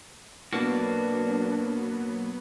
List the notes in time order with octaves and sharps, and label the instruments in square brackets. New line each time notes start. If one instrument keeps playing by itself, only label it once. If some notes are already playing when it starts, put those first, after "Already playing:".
[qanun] B2 A5 [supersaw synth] F#3 B3 [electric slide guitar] A#3 F#4 [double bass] D4